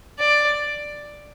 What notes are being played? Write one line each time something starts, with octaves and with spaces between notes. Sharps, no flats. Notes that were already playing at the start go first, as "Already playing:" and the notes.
D5